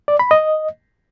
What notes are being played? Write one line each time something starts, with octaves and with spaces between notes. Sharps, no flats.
D5
B5
D#5